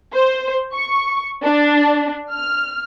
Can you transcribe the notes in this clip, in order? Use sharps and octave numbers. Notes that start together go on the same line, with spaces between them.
C5
C#6
D4
F6